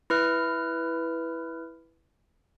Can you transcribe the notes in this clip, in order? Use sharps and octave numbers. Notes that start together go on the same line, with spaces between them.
E4 B4 F6